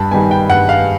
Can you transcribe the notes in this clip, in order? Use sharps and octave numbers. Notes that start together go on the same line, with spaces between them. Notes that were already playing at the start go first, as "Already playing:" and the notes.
Already playing: G2 A5 B5
D#3 G3 B3 G#5
G5
G2 F#5
F5